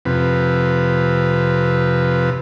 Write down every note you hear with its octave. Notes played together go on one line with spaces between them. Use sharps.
F2 C3 B4